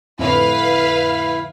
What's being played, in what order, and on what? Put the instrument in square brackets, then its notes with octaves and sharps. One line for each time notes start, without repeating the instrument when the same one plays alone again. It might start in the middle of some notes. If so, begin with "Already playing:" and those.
[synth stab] F2 A2 D3 [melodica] E4 [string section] B4 F5